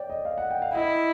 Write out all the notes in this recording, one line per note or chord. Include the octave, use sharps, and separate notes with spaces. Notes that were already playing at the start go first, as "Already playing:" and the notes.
Already playing: C#5 D5 G5
D#5
F5
F#5
G5
F5
E4 D#5